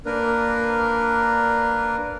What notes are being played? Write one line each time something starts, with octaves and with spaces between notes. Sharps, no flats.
A#3 D4 A#4 B4